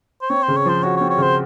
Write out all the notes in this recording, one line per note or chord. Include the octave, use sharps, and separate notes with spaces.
C5
C4 C#5
C5
C#3
C#5
F3 C5
F#4 C#5
C#5
C4
C#5
C#3 C5